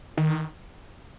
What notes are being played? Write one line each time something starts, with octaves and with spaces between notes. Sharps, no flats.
D#3